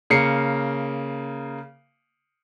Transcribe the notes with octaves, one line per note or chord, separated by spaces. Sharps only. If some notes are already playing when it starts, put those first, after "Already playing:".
C#3 A#3 C7 C#7